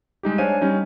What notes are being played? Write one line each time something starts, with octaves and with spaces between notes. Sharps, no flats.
G3 G#3 D#4 G4
D4 C5 C#5 F5 G#5 D#7
G3 C#4 D#4